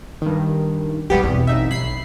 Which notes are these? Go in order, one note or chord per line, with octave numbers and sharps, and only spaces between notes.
G2 D#3
A#1 G2 G3 B3 G4
E2 B2 C4
A1 D#4 E5
B1 B5 C7